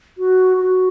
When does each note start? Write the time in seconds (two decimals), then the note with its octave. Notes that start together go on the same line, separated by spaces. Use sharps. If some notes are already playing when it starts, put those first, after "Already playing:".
0.18 F#4
0.57 F#4